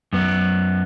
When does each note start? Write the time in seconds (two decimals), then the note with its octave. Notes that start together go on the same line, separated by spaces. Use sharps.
0.13 F#2 B3